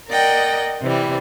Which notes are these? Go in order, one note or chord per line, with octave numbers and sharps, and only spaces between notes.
A#4 D5 D#5 F#5 G5
C3 E3 G3